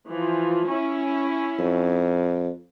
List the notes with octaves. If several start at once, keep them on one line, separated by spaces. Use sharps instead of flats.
E3 F3
C#4 E4
F2